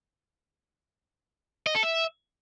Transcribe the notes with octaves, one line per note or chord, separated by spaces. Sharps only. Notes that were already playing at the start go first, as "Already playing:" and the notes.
D#5
A4
E5